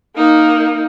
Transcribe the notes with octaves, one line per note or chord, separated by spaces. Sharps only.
A#3 D#4